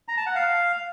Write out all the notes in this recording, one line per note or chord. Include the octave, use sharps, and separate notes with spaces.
A#5
A5
F#5
F5